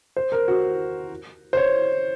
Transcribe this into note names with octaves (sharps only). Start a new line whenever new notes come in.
C5
A#4
F#4
C5
C#5